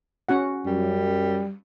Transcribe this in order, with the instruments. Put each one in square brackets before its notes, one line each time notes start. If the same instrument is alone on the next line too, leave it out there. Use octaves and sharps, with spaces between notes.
[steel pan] C#4 F#4 F#5
[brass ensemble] F#2 [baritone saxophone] G3